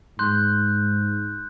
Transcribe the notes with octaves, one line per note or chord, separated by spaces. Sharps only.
G#2 C6 F#6 G6